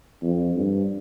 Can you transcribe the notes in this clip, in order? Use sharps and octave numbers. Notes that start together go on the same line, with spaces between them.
F2
G2